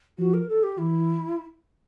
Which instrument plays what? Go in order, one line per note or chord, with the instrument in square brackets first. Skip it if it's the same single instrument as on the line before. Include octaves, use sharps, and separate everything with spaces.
[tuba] F3 [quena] F#4
[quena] A#4
A4
G4
[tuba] E3 [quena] E4